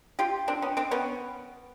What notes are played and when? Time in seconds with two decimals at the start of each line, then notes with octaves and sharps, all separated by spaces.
0.19 F4 G4
0.48 C4 D4
0.62 B3 C#4
0.77 C4 D4
0.91 B3 C#4